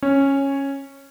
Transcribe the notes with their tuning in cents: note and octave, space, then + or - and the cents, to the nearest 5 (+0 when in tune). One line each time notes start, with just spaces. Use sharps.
C#4 -10 C#5 +0